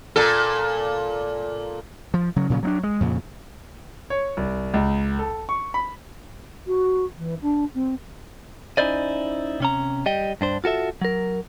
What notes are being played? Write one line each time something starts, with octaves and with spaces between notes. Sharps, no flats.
A#2 A4
F3
C#3 F#3
A#2 C#3 E3 F#3
F#3 B3 D4
G#3
F2 A#2 C#3
C#5
C2
C#2
A4
C#6
B5
F#4
E3
D4
C4
C#4 D#4 E4 C5 D5 D#5
C3 C#4 A#5
G3 D#5 G5
G2 D4 C5
F4 F#4 A4 E5
F#3 A#4